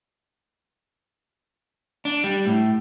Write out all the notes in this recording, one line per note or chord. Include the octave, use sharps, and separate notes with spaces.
D4
G3
A2